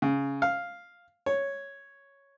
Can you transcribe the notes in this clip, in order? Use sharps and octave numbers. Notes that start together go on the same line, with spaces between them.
C#3
F5
C#5